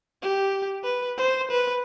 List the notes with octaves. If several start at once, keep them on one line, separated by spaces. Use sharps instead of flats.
G4
B4
C5
B4